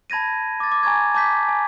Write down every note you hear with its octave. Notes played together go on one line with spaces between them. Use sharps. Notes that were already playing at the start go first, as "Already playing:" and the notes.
A5 B5 G#6 A#6 D#7
D6 A6
D6
G#5 A#5 C#6 G#6
A5 D6 G6 B6
G#5